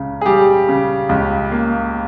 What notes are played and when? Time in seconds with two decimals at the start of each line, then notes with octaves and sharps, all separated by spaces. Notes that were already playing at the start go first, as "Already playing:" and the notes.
Already playing: C#2 C#3
0.21 G#4
0.26 G3 G4
0.69 C#3
1.09 C#2
1.52 A#3